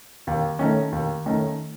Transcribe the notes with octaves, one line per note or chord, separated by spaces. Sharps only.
D#2
D#3 A3 C#4
D#2
D#3 A3 C#4